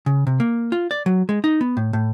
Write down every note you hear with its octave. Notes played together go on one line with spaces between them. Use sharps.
C#3
C3
A#3
F4
D5
F#3
G#3
D#4
B3
A2
A2